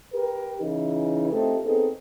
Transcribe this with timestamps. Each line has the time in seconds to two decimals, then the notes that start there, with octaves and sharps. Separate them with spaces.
0.13 G4 A#4 B4
0.60 C#3 E3 D#4
1.31 A3 C4 D#4 F4 G4 A4
1.64 B3 C4 D#4 G#4 A4